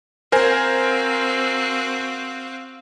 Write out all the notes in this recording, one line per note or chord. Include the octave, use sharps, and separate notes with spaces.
C4 F#4 A#4 C5 F5 G#5